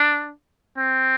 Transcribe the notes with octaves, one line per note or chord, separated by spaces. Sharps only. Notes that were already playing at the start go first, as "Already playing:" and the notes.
Already playing: D4
C4